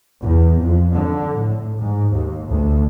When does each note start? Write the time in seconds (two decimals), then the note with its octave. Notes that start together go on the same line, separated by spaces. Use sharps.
0.20 E2
0.60 F2
0.93 D3
1.37 A2
1.77 G#2
2.12 D#2
2.49 D2